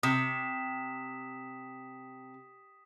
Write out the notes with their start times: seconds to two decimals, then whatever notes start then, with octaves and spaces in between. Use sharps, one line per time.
0.03 C3 D#6 B6 E7